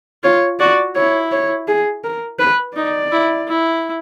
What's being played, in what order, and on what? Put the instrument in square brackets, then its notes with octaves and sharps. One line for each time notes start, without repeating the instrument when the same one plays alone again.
[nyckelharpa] F4 [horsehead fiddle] C#5
[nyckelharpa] F#4 [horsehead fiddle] D5
[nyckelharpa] E4 [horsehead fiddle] C#5
[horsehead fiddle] C#5
G#4
A#4
B4
[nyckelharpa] D#4 [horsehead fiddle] D5
[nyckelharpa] E4
E4